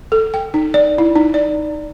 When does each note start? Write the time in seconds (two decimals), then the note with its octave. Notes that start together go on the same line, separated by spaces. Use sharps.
0.12 A4
0.34 G5
0.54 D#4
0.74 D5
0.98 E4
1.16 D#4
1.34 D5